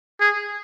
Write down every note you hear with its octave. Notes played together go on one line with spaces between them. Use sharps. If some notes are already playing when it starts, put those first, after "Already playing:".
G#4